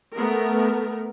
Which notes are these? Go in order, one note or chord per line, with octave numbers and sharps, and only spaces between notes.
A3 B3 A#4